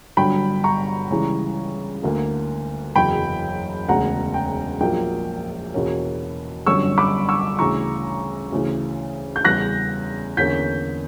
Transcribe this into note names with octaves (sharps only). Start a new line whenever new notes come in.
G1 G2 D3 F#3 G5 B5
A#5 C#6
C#2 C#3 E3 G3
D2 D3 A#3
F#1 E2 C#3 F#3 G5 B5
E1 D2 C#3 F#5 A#5
G5
A#1 A#2 F#3 A#3 G5
E2 B2 A#3 C#4
G1 F#2 D3 G3 C#4 C#6 E6
B5 D6
C#6 E6
D2 C#3 E3 A#5 C#6
D2 C#3 E3
G6
E2 C#3 G3 B3 F#6 A#6
E2 D3 A#3 C#4 G6 B6